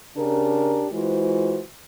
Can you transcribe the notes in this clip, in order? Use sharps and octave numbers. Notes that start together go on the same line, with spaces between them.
C#3 D4 G4 A#4
E3 G#3 F4 F#4 C5